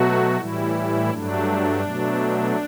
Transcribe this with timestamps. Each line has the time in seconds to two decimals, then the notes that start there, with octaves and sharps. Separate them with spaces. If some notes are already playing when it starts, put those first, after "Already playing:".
Already playing: B2 F#3 A3 F#4
0.37 A2 E3 G3 E4
1.10 G2 F#3 A3 D4
1.83 B2 F#3 A3